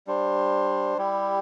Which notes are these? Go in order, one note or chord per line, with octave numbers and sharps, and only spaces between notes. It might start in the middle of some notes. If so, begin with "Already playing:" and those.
G3 D4 C5
G3 E4 G4